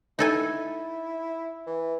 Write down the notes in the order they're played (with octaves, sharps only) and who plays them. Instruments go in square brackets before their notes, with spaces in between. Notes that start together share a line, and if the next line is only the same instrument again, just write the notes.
[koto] D#4 A4 G#5 [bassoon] E4
[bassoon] E3